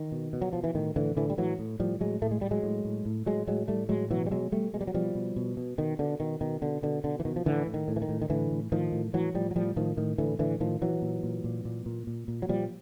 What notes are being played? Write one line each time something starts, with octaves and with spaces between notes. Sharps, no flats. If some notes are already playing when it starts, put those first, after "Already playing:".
Already playing: D#3
B2
B2
F#3
B2 F3
E3
A2 D#3
A2 D3 E3
A2 D3 E3
G3
A2 E3 F#3
A2
A2 F3 G3
A2 F#3 G#3
A2 A3
G#3
A2 G3
F#3 G#3
A2
A2
A2
A2 F#3 G#3
A2 F#3 G#3
A2 G3 A3
A2 F#3 G#3
B2 E3 F#3
G3
B2 F#3 G#3
B2 G3 A3
B2 G#3
G3
F#3
B2 F3 G3
B2
B2
B2
B2 D#3
B2 D3
B2 D#3
B2 D#3
B2 D3
B2 D3
B2 D3
E3
B2 D#3
F3
A2 D3 E3
A2
D#3
A2
E3
D#3
A2
D#3
A2 D3 E3
A2
A2 D#3 F3
A2
A2 E3 F#3
A2 F3 G3
F#3
A2 F3 G3
A2 D#3 F3
A2 D#3
A2 D3 E3
A2 D3 E3
A2 D#3 F3
A#2 E3 F#3
A#2
A#2
A#2
A#2
A#2
A#2
A#2
F#3
A#2 F3 G3